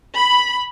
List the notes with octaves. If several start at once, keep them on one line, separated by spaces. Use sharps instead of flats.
B5